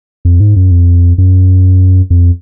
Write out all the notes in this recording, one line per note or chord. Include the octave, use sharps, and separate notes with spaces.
F2
G#2
F#2
F2
F#2
F2